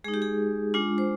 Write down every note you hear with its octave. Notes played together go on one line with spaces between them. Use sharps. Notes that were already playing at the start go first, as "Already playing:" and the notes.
G#3 D#4 G#4
G4
G#4
G#3 D4 F4
C5